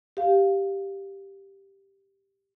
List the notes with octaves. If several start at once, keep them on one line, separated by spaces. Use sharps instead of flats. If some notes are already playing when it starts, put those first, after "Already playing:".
G4 F5